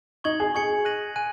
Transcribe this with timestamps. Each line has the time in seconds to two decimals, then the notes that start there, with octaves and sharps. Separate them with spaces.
0.24 D#4 C#6 G#6 F#7
0.40 G#4
0.55 G#4 C#6 G#6 C#7 F#7
0.85 F#6 A#6 D#7 F#7
1.16 G#5 F#6 D#7